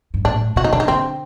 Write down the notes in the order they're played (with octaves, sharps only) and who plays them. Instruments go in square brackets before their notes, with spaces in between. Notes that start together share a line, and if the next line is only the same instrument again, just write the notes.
[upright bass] G2
[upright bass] A2 [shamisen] D4
[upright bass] C3 [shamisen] F#4
[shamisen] D#4
[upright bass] D3 [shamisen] D4
[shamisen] D#4
[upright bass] D3 [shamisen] C4